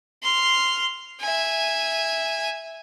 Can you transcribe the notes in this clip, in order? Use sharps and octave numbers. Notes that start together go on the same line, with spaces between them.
C6 F6
E5 G#5